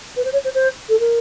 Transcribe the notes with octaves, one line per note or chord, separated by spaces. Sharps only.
B4
C5
C#5
C5
C5
A4
A#4